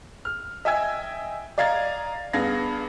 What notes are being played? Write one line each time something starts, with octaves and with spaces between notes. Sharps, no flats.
F6
D#5 E5 G5 G#5 E6 G#6
D5 D#5 F5 A#5 G#6 A6
G2 B3 G#4 F5 G#6 A#6